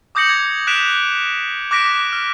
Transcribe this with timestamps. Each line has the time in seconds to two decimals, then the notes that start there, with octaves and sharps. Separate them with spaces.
0.15 D6 D#6 G6 A#6 C#7 F#7
0.29 G#6
0.67 F#6 B6 D7 E7 F7
1.71 D6 F#6 A#6 B6 D7
2.13 F6